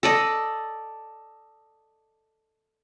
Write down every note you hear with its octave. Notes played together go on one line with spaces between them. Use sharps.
A4 D5 D#5